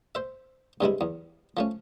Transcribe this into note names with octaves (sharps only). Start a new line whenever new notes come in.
C5 E5
G2 C3 G#3 E4
E2
F3 A3 C#4